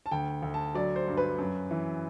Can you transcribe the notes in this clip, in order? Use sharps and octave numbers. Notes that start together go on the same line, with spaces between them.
A5
D2 G5
D2
A5
F#3 D5
C5
G2
B4
F#2
E3